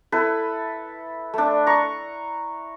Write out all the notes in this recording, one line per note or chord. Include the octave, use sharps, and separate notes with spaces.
E4 A4 B4
A3 D4
A#5 C#6